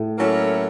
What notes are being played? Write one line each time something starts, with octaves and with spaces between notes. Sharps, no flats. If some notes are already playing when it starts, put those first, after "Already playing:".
Already playing: A2
F#3 A#3 C#4 E4 A4